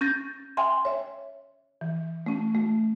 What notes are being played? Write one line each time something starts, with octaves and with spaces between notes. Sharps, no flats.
C#4 G6 A6 A#6
E5 G5 G#5 C6
C#5 E5
E3
A3 C#4
A3